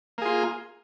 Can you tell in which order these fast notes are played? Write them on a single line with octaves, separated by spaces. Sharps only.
A#3 G#4 F4